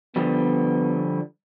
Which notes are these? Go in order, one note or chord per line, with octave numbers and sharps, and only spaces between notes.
D3 F3 G3 B3